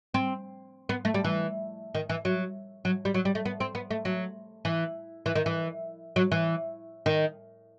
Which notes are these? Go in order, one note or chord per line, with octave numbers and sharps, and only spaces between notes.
C4
B3
A3
G3
E3
D#3
E3
F#3
F#3
G3
F#3
G3
A3
B3
C4
B3
A3
F#3
E3
E3
D#3
E3
F#3
E3
D#3